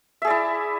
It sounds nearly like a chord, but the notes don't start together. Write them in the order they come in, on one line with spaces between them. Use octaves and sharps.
E5 G#4 D5 E4